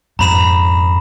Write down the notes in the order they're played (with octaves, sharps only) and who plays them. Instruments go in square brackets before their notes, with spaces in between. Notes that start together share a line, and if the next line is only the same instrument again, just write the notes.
[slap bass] F2 G#2 [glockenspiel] A#5 B5 E7